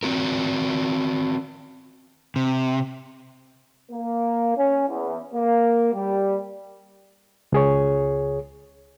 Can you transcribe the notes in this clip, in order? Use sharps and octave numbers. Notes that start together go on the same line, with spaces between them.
C4 F#4 A#4
C3
A#3
C#4
E2
A#3
G3
C#2 G#4 C#5